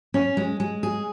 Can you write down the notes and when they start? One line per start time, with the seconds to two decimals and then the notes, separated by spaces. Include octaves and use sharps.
0.14 C#4
0.37 G#3
0.60 G#3
0.83 G#4